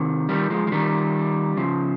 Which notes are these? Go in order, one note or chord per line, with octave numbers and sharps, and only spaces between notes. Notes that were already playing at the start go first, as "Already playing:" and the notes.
Already playing: C3 D#3
D#3 G3
F3 G#3
F3
D#3 G3
C#3 F3